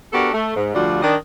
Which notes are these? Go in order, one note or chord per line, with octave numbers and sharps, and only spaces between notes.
B3 D4 F#4 G4 A4 A#4
A3
G#2
D2 F3 G3 F4 F#4 D5
D#3 D4 D#5